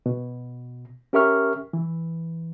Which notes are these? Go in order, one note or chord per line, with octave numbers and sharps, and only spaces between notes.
B2
C#4 G4 A#4 E5 C#6 F6
E3